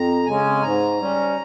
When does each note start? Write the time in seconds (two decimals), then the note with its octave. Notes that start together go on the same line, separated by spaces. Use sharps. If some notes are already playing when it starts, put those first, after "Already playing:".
Already playing: F2 A#5
0.26 C#3 G#3 C#4 G#5
0.62 G#2 A#5
0.99 G3 C#4